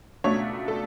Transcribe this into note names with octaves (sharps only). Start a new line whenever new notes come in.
C#2 B2 A3 D4 C#5
A4